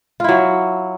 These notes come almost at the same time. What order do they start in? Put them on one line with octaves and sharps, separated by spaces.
F4 E4 F#3